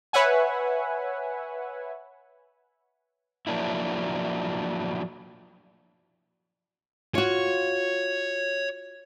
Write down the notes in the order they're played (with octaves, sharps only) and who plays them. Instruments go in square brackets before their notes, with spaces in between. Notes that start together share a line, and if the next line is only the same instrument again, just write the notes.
[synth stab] B4 C#5 E5 F#5 G#5
[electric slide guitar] F3 F#3 A#3 D4 E4
[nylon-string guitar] F4 F#4 [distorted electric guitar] C#5